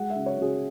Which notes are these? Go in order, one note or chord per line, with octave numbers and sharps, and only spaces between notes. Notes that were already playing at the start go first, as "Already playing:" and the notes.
Already playing: G#3 F#5
E5
C#3
C#5
C#3 G#4